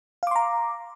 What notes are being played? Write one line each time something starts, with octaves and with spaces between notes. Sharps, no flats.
F5 A#5 C6 D6